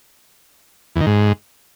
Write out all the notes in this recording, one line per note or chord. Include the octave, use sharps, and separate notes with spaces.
E2
D#3
G#2